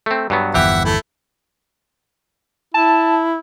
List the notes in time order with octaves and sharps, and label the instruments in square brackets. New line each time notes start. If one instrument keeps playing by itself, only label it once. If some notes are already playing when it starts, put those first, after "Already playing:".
[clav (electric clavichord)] A3 C4
G2 F#3 B3
[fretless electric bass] G1 E2 F3 [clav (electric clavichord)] E3 G4 [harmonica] E5 F#5
[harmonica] A3 E4
[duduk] E4 [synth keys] A5